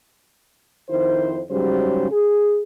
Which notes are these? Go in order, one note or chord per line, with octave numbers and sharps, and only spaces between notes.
F2 D#3 E4 C5
G#2 C#3 F#3 G3 C5
G#4